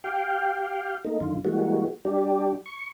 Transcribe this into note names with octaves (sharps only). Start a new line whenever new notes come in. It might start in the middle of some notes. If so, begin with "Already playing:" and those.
G4 F5 G5
A3 A#3 D#4
F#2 D3 D#3 F4
E3 G3 G#3 A#3 F#4
G3 D4 G4
C#6